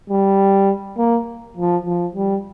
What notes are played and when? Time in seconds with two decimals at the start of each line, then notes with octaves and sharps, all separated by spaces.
0.10 G3
0.98 A#3
1.57 F3
1.86 F3
2.16 G3